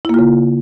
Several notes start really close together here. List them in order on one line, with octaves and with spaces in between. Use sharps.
E4 A#3 F4 C#3